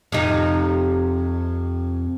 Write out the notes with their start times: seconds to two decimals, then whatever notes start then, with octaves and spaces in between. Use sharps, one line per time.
0.12 F2 C3 D#4